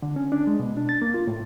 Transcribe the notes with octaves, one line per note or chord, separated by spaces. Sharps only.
D3
C#4
D4
G#3
B2
D4
A6
A#3
F4
A2